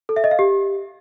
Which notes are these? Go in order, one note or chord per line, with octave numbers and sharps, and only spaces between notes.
A4
E5
D#5
F5
G4